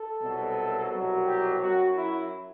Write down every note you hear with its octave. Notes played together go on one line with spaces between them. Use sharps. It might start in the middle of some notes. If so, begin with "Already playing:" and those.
Already playing: A4
C2 B2 F#3
C2 B2 F#3
G4
F#2 F#3 F#4
E4